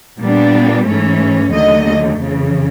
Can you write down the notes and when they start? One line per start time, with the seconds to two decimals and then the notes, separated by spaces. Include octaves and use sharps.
0.19 A#2 G3 B3 D4
0.86 G#2 E3 A3 C#4
1.52 D#2 D3 F#3 A3 D#5
2.19 F2 C#3 E3